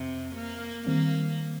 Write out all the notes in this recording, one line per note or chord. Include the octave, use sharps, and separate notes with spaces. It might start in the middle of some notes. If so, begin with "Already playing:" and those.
Already playing: F2 C3 C4
A#3
D#3 G3 A#3 C4